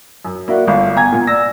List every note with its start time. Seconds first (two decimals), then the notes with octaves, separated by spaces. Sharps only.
0.25 F#2
0.48 A#3 E4 F#4 D5
0.68 G1 F5
0.96 B3 G5 G#5 A#5 G#6
1.12 A#2
1.27 D5 E6 A#6